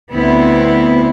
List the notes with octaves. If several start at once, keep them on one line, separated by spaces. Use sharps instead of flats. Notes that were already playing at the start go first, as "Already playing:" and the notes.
D2 B3 C4 E4